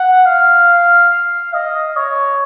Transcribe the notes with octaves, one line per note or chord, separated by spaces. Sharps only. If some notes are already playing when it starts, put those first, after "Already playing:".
Already playing: F#5
F5
D#5
C#5